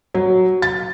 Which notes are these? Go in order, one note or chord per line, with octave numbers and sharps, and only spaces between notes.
F#3
A6